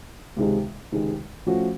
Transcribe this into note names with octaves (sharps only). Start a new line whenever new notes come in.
C#2 C3 D#3 G#3
C#2 C3 D#3 G#3
F3 A3 C#4 F#4